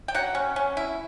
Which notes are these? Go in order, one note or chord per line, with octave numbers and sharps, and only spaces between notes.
G5
F#3 F#5
C#4
C#4
E4